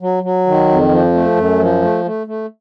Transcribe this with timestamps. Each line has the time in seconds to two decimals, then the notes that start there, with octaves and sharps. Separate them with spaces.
0.01 F#3
0.23 F#3
0.47 D#3
0.69 F2
0.91 F3
1.14 A3
1.36 F#2
1.59 F3
1.82 A3
2.05 A3
2.27 A3